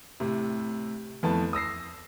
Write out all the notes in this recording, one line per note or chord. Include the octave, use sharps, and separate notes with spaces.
A2 C3
F2 A3 B3 E4 A5
D#6 E6 A#6 C7